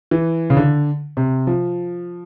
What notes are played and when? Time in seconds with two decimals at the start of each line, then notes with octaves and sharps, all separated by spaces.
0.11 E3
0.50 C#3
0.57 D3
1.17 C3
1.47 F3